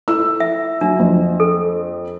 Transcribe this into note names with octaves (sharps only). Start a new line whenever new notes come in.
E4 A4 E6
E5
F#3 D4
F2
A4